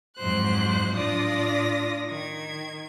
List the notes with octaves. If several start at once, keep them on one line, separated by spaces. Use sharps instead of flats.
F2 G#2 F#3 C5 F#6
A2 D4 F4 D5 D#6 A#6
D#3 G#6